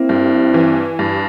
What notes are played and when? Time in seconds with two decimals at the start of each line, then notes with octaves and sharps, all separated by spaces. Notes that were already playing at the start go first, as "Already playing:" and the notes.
Already playing: A#3 C4 E4
0.09 G2
0.54 E3
0.99 G2